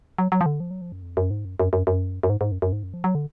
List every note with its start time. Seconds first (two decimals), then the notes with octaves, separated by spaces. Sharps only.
0.18 F#3
0.32 F#3
0.41 F3
0.46 D3
0.60 F3
0.71 F#3
0.81 F3
0.92 F#2
1.03 F2
1.17 F#2
1.31 G#2
1.45 F#2
1.60 F#2
1.73 F#2
1.87 F#2
2.23 F#2
2.30 G#2
2.41 G#2
2.52 F#2
2.62 F#2
2.72 G#2
2.83 F#2
2.94 F3
3.04 F#3
3.15 D3